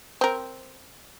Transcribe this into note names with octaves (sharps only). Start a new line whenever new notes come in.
C4 A#4